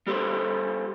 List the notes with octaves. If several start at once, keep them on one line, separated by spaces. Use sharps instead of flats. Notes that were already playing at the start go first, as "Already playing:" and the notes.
G3 G4 A4 B4 C5